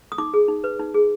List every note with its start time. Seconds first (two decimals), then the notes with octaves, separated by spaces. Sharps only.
0.12 D#6
0.18 D#4 D6
0.34 G#4
0.48 D#4
0.64 B4
0.79 D#4
0.94 G#4